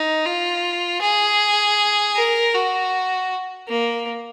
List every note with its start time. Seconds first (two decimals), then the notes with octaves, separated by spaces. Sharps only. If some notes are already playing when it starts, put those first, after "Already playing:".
Already playing: D#4
0.26 F4
1.01 G#4
2.16 A#4
2.54 F#4
3.68 A#3